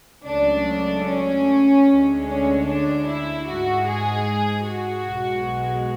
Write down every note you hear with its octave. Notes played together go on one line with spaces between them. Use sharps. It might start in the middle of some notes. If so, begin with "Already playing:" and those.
C#2 C#3 F#3 A3 D4
C#4
D2 D3 G#3
C#4
D4
E4
G#2 G#3 F#4
G#4
F#4
B1 B2 G#3